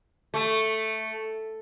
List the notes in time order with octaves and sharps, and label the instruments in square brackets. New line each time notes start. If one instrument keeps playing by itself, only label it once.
[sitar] A3